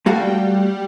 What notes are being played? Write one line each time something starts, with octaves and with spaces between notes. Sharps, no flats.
G3 A3 F#4 F5